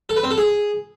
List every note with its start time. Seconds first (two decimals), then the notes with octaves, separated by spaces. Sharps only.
0.09 A4
0.16 B4
0.24 C4
0.31 A4
0.38 G#4